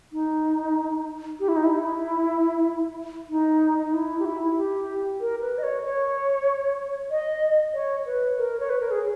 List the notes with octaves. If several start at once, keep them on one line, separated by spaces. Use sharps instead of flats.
D#4
G4
E4
D#4
E4
D#4
D#4
E4
G4
E4
G4
A#4
B4
D#5
C#5
C#5
D#5
C#5
B4
A#4
C#5
B4
A#4
G#4